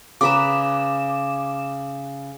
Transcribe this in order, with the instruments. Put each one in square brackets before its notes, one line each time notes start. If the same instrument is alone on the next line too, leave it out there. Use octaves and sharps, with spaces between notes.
[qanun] C#3 B4 A#5 [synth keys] D6 E7